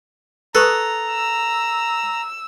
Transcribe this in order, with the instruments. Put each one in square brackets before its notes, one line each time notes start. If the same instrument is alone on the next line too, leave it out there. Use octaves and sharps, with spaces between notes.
[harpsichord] A4 [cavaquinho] B4 C#6 D#6 [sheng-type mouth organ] A#5
[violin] E6